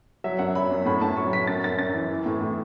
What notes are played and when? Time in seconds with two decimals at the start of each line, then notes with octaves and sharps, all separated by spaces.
0.24 F#3 E5
0.39 F#2 F#5
0.55 F#3 B5
0.71 F#2
0.85 A2 B5
1.01 A2 A5
1.17 F#3 C#6
1.32 F#3 B6
1.47 F#2 A6
1.64 F#2 A6
1.79 F#2 A6
1.94 E3
2.11 E3
2.26 A2
2.41 A2